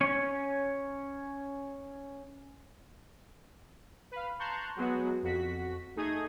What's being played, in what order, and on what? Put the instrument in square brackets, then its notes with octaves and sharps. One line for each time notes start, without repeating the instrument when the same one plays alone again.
[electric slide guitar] C#4 C#5
[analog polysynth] B4 F5
A5 A#5 C6 C#6 F#6 G6
F#3 G#3 B3 F#4
F2 F#4 B6
A3 D#4 G#4 D#6 G#6